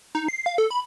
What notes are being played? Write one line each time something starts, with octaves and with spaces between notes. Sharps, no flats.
D#4
C7
F5
A4
B5